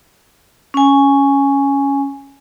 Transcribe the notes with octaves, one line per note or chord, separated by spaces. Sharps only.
C#4 G#5